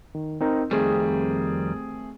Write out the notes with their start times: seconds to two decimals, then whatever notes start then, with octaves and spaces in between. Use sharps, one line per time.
0.15 D#3
0.41 C4 D#4 A#4
0.71 F2 D#3 G3 A3 C4 G#4